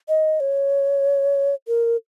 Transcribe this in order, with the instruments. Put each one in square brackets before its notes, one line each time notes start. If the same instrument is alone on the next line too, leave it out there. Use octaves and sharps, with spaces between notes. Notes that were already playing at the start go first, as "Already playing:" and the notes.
[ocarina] D#5
C#5
A#4